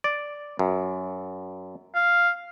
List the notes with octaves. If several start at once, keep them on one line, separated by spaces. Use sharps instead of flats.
D5
F#2
F5